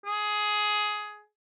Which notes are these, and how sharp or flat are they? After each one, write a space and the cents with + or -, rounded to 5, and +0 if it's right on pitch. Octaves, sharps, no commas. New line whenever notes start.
G#4 +15